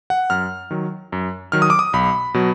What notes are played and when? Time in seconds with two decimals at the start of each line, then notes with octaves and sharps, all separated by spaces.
0.10 F#5
0.30 F#2 F6
0.71 D#3 F#3
1.12 F#2
1.52 D#3 F#3 F6
1.62 D#6
1.70 D6
1.79 D#6
1.93 B1 B5
2.34 B2 F#3